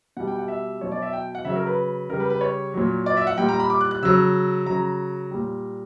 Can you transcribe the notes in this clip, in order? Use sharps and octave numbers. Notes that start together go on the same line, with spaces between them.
B2 G3 F#5
G5
F#5
E5
B2 F#3 C#5
D5
E5
G5
F#5
C#3 F#3 E5
A#4
B4
C#3 G3 A#4
B4
B4
C#5
A#2 F#3
D5
E5
F#5
A#2 G3 G5
A#5
B5
D6
F#6
F#6
C#3 F#3 E6
C#3 F#3 A#5
A#2 G3